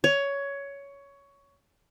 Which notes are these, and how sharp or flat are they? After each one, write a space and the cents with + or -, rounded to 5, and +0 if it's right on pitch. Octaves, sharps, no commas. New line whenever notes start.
C#5 +15